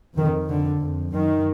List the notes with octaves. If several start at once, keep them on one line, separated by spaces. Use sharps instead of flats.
F2 D#3
F2 D3
F2
F#2 D#3